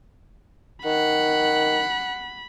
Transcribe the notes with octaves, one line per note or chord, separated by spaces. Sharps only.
D#3 F#5 B5